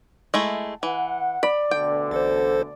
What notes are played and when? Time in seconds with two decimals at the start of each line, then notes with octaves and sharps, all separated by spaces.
0.34 G#3 A3 E4
0.83 E3 F#5
1.43 D5 B5
1.71 D2 B2 D3 G5
2.11 A1 A4 C5